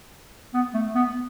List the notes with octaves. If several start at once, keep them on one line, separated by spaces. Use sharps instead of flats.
B3
A3
B3